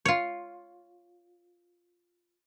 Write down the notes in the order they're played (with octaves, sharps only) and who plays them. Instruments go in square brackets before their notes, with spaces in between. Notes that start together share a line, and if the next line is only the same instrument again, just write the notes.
[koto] F4 C#5